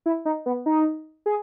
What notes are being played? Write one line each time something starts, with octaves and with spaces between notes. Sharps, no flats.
E4
D#4
B3
D#4
G#4